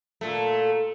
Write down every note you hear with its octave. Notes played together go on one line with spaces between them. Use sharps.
A#2 A3